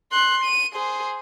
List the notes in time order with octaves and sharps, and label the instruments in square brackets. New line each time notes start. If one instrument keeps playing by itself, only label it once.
[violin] C6 F#6
D#7
G#4 C5